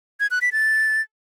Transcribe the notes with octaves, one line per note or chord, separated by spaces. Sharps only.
G#6
F#6
B6
A6